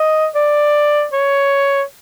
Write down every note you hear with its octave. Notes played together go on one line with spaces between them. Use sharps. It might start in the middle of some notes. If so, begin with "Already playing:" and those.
Already playing: D#5
D5
C#5